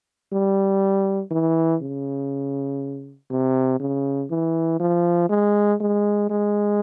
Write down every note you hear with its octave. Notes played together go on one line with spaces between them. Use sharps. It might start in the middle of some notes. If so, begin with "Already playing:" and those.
G3
E3
C#3
C3
C#3
E3
F3
G#3
G#3
G#3